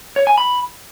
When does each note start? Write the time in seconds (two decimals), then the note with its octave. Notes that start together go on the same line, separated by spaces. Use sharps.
0.16 C#5
0.27 G#5
0.38 B5